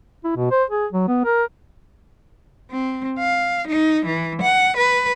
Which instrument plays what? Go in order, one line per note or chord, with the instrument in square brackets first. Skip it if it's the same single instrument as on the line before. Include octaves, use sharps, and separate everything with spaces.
[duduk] E4
B2
C5
G#4
F#3
B3
A#4
[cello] C4
F5
D#4
E3
F#5
B4